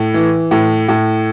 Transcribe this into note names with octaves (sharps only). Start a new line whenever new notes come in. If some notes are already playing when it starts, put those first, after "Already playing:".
Already playing: A2
E3
A2
A2